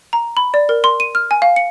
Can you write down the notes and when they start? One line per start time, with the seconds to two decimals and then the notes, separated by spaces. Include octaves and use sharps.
0.13 A#5
0.37 B5
0.54 D5
0.69 A#4
0.84 C6
1.00 D#7
1.15 F6
1.31 G#5
1.42 F5
1.56 C#7